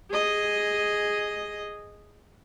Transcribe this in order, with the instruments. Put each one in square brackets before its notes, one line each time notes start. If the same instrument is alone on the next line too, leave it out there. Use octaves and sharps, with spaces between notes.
[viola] G#4 D#5